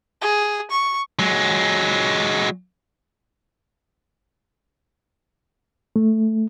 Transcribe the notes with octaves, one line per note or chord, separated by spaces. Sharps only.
G#4
C#6
F#3 G#3
A3